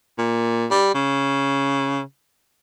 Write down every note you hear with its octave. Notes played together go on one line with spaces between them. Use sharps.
A#2
G3
C#3